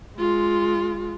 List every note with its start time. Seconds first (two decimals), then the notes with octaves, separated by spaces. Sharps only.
0.17 G#3 F4